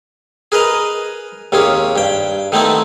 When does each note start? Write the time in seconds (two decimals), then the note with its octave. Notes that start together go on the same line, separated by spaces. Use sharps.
0.52 G#4 A#4 B4 D#5 A#5
1.52 D#2 C3 A#3 C#4 G#4
1.96 G2 G5
2.52 D#3 A3 B3 C4 D#4 E4